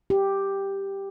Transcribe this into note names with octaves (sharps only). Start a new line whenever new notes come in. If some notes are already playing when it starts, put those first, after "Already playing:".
G4